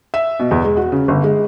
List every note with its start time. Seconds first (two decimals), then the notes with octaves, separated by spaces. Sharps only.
0.14 E5
0.40 B2
0.51 E2
0.64 G#3
0.77 F#4
0.92 C#3
1.08 G1
1.24 G#3